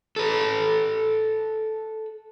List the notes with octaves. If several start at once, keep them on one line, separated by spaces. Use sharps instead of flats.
A4 B4